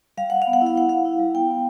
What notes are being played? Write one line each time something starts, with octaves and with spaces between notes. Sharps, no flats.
G3 F5
G3 F#5
F5
B3
F#5
E4
F5
E4 F#5
E4 F5
E4
G3
B3 G5
B3